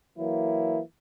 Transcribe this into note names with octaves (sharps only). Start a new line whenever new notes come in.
E3 F#3 A#3 E4